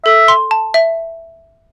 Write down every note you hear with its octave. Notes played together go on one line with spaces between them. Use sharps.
A4 E5
C6
A5
E5